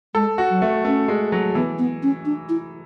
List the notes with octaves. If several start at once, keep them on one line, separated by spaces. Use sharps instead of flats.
G#3 A4
F#4
F#3
A3
A3 C#4
G#3
F#3
E3 B3
B3
C#4
D4
E4